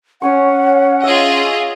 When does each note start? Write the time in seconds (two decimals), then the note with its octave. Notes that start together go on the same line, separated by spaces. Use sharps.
0.22 C#4 C#5 F#5 G#5 C#6
1.04 F4 G#4 D#5 E5